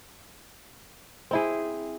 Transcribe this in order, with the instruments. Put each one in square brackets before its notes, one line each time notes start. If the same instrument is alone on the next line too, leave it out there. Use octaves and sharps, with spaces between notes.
[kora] C4 E4 G#4